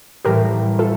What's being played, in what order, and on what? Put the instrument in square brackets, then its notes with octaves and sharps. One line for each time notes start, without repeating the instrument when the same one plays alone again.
[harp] A1 A2 E3 G3 C4 [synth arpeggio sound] G4 A#4
[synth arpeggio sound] F4 A4